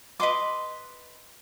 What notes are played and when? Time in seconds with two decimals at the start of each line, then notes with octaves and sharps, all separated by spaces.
0.20 B4 D#5 C6 D6